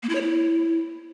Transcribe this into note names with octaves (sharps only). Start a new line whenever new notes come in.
A#3
E4
C#5
E4